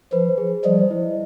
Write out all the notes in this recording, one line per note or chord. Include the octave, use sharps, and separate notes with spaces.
F3 B4
G#4
F3 G3 D#5
E4